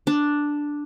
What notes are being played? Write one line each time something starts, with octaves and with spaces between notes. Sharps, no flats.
D4